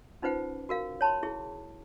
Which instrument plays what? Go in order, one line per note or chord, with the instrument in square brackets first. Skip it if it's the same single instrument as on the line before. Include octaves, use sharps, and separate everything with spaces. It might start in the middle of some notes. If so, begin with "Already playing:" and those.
[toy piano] C#4 D#4 F4 B4 C5 F#5
F#4 A#4 F5
C#5 A5 B5 C6
E4 G#4